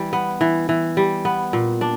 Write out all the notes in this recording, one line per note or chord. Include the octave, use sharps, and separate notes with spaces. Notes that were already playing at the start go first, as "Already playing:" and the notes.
Already playing: E3 G3
B3
E3
E3
G3
B3
A#2
D4